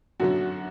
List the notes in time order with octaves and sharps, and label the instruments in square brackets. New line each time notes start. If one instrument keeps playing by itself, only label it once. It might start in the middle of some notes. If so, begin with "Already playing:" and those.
[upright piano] F#2 D3 F#3 [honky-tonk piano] F#4